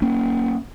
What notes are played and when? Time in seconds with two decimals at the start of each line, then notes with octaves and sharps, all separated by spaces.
0.02 A#3 C#4